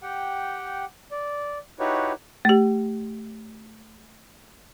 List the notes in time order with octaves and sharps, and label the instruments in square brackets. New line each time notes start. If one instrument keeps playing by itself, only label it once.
[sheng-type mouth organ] G4 F#5 G5
D5
D#4 E4 F#4 G4 B4 C#5
[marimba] A3 G4